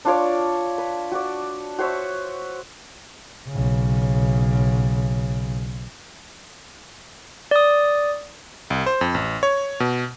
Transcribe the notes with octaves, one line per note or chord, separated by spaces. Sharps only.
D4 F4 C#5 D5
B4
F#4 D5
F#4 C5 C#5 E5
B1 C#3
D5 D#6
C2
C5
F2
A1
C#5
B2